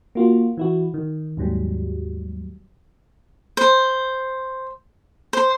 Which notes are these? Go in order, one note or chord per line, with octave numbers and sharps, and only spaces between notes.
A#3 F4 F#4
E3 E4 F#4
D#3
D#2 G#2 F#3 G3
C5
C5